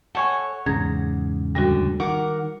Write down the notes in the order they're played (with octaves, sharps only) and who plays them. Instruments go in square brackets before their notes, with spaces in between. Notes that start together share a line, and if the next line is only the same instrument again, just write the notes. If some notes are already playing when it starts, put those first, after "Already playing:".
[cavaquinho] A4 C#5 G#5 [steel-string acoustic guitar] F#5
[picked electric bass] E2 G#2 C#3 [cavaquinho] A#5 [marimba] G#6
[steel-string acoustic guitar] D2 D3 [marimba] G3 F#4
[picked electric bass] D#3 [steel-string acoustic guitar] A#4 F#5 [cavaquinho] D6